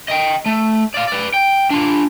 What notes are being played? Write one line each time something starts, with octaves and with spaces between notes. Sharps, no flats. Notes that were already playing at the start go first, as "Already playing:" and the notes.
D#5 G5
A3
D5 F5
B4 D5
G5
D4 F4